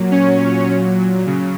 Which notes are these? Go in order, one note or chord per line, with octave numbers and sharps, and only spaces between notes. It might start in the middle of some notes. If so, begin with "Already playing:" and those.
Already playing: A#2 F#3
C#4 C#5
C#3 F#3